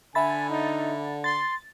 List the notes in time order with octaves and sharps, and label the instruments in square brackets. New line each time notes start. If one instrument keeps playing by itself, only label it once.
[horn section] D3 [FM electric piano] E5 B5 A6 [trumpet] G#5
[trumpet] D#4
[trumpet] C6 [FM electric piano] A6